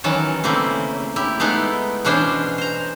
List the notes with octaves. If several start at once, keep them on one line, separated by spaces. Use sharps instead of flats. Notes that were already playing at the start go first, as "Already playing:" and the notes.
D#3 E3 F#3 C#4 A5
C#3 A3 A#3 C4 E4
E4 G4
G#3 A3 B3 D#4 E4
B2 E3 C#4 D4 G#4 C5
C5 A#5